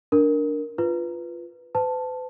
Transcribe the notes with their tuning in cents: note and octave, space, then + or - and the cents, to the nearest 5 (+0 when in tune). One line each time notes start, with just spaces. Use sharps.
D4 +0 A#4 +0
F4 -10 B4 +0
B4 +45 A5 +0